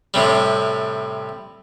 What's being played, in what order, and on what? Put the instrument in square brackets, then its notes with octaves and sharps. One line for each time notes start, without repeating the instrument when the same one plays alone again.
[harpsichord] A2 C3 G3